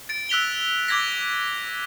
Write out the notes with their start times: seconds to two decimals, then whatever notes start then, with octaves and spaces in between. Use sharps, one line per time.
0.09 A6 D7
0.29 E6 F#6 B6 F7 G7
0.88 D6 E6 G#6 A#6 B6